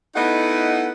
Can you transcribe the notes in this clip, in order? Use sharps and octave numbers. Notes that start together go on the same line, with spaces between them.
A3 B3 D#4 E4 D#5 F#5